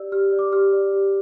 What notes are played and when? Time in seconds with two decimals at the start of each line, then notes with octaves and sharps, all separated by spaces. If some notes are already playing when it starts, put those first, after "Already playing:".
Already playing: G4 D5 E6
0.12 G4 F6
0.32 D5
0.39 D6
0.52 G4 F6
0.73 D5
0.93 G4